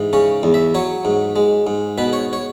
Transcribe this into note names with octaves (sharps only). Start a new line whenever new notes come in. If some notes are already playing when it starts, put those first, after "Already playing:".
Already playing: G#2 E3
C#3 C#4
E2
E5
F#3 C#5
G#2
G#3
G#2
B2 B4
C#5
C#5